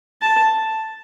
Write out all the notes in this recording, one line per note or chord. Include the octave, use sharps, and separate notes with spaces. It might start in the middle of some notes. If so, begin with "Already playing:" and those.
A5